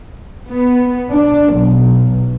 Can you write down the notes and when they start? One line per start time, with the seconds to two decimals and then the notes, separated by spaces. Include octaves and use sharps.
0.50 B3
1.10 D4
1.54 B1